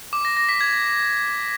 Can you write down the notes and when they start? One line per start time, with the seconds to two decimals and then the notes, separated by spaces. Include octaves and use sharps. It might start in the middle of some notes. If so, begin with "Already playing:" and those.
0.13 D6
0.25 A#6
0.37 A#6
0.49 B6
0.61 G#6